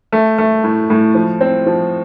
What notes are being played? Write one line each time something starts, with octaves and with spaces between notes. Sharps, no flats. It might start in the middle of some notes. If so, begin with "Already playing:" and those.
A3
A3
A2
A2
F3
C4
F3